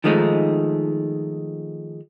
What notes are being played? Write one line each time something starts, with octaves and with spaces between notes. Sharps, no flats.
D#3 F3 G#3 A3 D#4